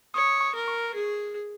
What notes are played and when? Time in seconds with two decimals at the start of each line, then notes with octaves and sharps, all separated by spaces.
0.14 C#5 D#6
0.41 C#6
0.55 A#4
0.68 C#6
0.94 G#4